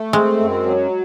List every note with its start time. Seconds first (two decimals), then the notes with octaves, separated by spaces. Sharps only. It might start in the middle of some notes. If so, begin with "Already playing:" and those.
Already playing: A3
0.13 G#3 C4
0.40 F#2
0.65 F#3